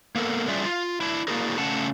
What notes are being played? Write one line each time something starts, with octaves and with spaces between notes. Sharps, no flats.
A#3 B3 A4 A#4
G3 C#4 D4 F4 G#4 E5
F4
D4 E4
A#3 D4 E4 F#4 G#4 A#4
C#3 A3 C#4 F#5 A5